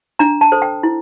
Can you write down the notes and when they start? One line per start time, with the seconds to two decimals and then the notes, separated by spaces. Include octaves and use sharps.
0.19 D4 A#5
0.41 A5
0.52 A4 C5
0.62 G5
0.83 E4